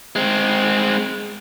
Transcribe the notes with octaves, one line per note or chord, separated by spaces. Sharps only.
G#3 C4